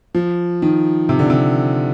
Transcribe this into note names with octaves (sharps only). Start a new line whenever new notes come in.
F3
D#3
C3
D3
C3